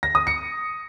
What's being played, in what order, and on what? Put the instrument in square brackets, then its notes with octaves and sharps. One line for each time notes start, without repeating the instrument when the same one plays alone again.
[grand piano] A#6
D#6
C#7